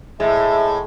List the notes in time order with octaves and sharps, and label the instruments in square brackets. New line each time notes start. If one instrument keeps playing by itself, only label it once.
[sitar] A2 [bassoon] G#3 [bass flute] E5